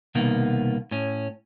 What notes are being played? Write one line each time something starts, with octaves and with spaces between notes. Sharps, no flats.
C2 B2 D#3 A#3 B3
A2 C#4